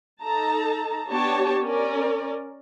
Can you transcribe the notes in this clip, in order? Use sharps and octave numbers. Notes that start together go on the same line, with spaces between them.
D#4 A4 A5 A#5
B3 D4 G4 C#5 A5
C#4 A#4 D5